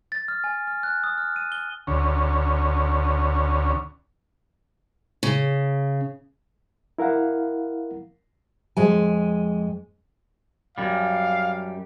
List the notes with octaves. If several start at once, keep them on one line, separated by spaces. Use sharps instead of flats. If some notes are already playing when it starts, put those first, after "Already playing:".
A6
F6
G#5
F6
F#6
D#6
F6
D#7
G7
D2 C#4
C#3
E4 A#4 F5 F#5
F2 G#3 G#5
F#2 G3 F5